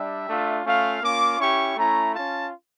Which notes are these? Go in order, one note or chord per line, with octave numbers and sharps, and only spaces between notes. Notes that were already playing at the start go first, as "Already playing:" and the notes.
Already playing: G3 D4 G4 E5
A3 D4 F4
A3 C#4 F4 F5
A#3 C#4 F4 D6
C#4 E4 G4 C#6
A3 C#4 E4 A#5
C#4 F4 A5